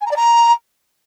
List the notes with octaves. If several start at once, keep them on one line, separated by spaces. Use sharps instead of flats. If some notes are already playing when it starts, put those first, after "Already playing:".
G#5
A#5
D5
A#5